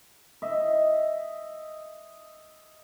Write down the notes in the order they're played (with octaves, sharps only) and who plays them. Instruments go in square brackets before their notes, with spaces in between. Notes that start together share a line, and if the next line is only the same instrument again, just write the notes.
[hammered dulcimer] D#5 E5